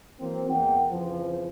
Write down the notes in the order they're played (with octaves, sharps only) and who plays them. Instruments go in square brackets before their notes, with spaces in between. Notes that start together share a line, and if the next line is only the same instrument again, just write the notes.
[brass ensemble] E3 F#3 A#3 C4
E2 G#3 A#3 F#5 G5
F2 C#3 E3 F3